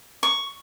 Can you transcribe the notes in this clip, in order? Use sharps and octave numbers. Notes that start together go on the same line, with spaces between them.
C#6